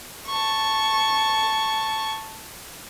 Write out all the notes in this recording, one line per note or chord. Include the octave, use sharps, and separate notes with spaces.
A5 C#6